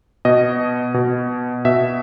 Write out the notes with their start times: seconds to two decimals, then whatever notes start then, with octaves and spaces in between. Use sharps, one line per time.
0.25 B2 D#5
0.94 B2
1.65 B2 E5